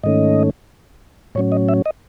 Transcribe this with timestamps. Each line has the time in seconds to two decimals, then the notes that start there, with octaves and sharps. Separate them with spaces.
0.03 G#2 D#3 A3 C#4 D#5
1.35 A2 F#3 C#4 C#5
1.52 D#5
1.69 E5
1.86 D#5